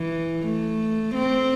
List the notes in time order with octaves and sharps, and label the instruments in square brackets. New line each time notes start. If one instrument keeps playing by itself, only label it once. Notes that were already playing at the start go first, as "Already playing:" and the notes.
Already playing: [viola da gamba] E3
A3
C4